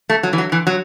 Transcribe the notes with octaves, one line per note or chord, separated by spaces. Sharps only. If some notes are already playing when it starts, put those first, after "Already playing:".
A3
F#3
E3
F#3
E3
F#3